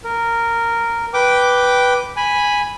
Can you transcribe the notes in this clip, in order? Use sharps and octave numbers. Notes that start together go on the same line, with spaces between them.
A#4
B4 G5 D6
G#5 B5